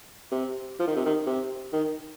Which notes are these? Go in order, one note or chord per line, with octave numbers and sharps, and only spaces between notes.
C3
F3
D#3
C3
D#3
C3
D#3